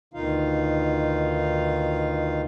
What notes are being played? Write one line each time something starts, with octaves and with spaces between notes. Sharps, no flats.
D2 B2 D#3 D#4 F4 F5